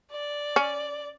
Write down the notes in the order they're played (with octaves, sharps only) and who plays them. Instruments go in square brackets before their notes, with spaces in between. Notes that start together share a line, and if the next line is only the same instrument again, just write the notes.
[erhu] D5
[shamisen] C#4